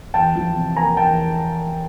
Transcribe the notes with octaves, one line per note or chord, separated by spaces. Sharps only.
E2 G5 A5
F3
C3
A#3 G#5 A#5
E2 G5 A5